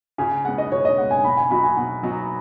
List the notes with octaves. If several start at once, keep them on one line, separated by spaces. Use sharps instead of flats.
C#3 G#5
G#5
G#3 B3 F#5
D#5
C#3 C#5
D#5
G#3 B3 F#5
G#5
B2 B5
G#5
F#3 B3 D#4 F#4 B5
G#5
B2 F#5
F#3 B3 D#4 F#4